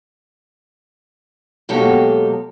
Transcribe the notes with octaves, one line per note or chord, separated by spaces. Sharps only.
B2 F#3 G#3 A#3 G4 A4